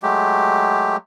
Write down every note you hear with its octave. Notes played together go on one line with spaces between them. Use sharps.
F#3 G#3 A3 G4